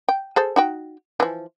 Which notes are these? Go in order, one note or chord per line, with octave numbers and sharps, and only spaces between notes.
G5
G#4 A4 C5
D#4 F#4 G5
E3 F3